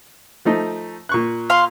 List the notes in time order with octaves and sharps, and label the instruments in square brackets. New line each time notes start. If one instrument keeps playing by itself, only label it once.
[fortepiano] F3 A3 D#4
A#2 C#6 F#6
[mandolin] F5 C6